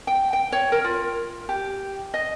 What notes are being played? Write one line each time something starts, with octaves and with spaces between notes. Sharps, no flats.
G5
G5
C#5
A#4
F4
G4
D#5